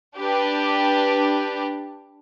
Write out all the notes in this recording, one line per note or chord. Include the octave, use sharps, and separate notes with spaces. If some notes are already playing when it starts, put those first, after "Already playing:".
D4 G4 B4